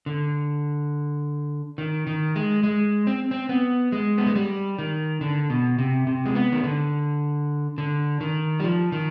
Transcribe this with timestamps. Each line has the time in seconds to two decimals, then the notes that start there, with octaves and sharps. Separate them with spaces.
0.06 D3
1.78 D#3
2.07 D#3
2.36 G#3
2.63 G#3
3.07 C4
3.31 C4
3.49 B3
3.92 G#3
4.18 B3
4.26 G#3
4.35 G3
4.79 D#3
5.21 D3
5.50 B2
5.78 C3
6.07 C3
6.26 G#3
6.35 B3
6.52 D#3
6.64 D3
7.78 D3
8.21 D#3
8.60 G3
8.64 F3
8.92 D#3